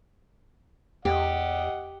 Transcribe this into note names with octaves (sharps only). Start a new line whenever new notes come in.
E2 G4 D#5 F#5